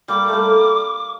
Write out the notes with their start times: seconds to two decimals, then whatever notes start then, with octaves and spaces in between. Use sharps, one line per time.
0.08 G3 A#3 D6
0.28 G3 A3 A#3